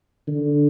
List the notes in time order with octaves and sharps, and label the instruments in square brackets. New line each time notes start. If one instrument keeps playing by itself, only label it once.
[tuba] D3